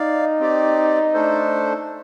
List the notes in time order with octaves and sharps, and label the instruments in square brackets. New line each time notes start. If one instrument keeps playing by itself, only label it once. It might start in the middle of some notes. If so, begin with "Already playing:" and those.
Already playing: [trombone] D#4 [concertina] D5 F5
[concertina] C4 G4 D5
A3 D4 A4 C5